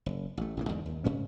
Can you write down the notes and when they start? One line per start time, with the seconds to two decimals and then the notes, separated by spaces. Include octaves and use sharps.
0.06 F#1
0.37 A1 A3
0.57 A1 C#3 A#3
0.68 E2 G#2 D3 D#3
0.86 D#2
1.04 G#2 C#3 C#4